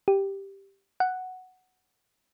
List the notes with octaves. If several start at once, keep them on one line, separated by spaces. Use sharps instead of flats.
G4
F#5